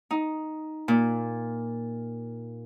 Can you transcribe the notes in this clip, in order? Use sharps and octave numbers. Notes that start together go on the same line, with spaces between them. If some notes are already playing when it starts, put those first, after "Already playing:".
D#4
A#2